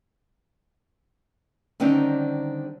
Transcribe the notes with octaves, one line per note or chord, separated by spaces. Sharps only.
D3 D#3 G3 C4 C#4 D#4